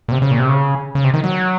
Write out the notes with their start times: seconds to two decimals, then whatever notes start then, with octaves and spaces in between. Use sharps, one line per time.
0.09 A#2
0.12 C3
0.22 C#3
0.31 A#2
0.40 C3
0.49 C#3
0.95 C#3
1.04 C3
1.14 D#3
1.24 F#3